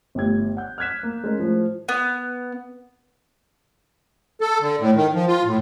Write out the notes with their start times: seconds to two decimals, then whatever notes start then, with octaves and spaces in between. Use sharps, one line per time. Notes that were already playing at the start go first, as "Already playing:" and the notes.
0.15 G1 A2 G4 G#6
0.57 F#5 G6
0.78 F6 F#6 G#6 B6 E7
1.03 A#3
1.24 G#3 C#4 A#4
1.40 A2 F3
1.89 B3
4.41 A4
4.61 D3
4.80 A2
4.96 D#3
5.14 F3
5.28 F4
5.45 A2